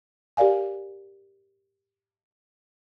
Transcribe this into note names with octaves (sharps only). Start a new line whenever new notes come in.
G4 A#4 D5 F5 G#5